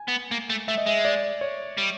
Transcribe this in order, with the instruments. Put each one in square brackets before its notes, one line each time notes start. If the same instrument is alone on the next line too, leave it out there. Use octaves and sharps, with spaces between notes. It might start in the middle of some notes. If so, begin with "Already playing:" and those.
Already playing: [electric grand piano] G#5
[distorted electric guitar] B3
A#3
A3
[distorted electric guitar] A3 [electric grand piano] E5
[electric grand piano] D#5
[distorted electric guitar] G#3 [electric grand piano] E5
[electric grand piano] D5
C#5
[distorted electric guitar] G3